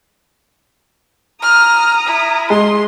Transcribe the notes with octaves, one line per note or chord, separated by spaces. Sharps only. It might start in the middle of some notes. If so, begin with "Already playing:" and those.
A#5 D#6 F6
E4
G#3 C6